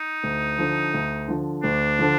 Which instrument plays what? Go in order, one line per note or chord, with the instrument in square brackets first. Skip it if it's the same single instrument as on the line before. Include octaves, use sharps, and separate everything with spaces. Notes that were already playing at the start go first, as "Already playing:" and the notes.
Already playing: [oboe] D#4
[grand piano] D2
D3 F3
D2
D3 F3
[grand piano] D2 [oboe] D4
[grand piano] D3 F3